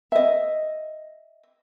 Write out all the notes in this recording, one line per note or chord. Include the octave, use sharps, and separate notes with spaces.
D#5 E5